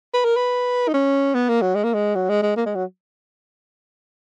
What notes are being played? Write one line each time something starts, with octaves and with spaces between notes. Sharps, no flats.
B4
A#4
B4
D#4
C#4
B3
A#3
F#3
G#3
A#3
G#3
F#3
G#3
G#3
A#3
G#3
F#3